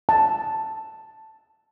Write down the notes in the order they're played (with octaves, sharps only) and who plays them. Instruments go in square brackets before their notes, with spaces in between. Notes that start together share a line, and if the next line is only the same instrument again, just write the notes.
[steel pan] A5